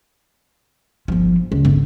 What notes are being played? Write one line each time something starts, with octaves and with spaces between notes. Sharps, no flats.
G1 F3
C#2
G1